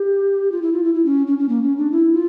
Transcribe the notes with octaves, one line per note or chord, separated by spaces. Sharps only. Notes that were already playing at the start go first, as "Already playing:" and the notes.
Already playing: G4
F4
E4
F4
E4
E4
C#4
C#4
C#4
A#3
C#4
D4
E4
F4